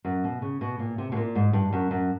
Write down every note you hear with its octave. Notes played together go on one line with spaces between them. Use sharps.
F#2
B2
C#3
B2
A#2
C3
B2
A#2
G#2
G2
F#2
F#2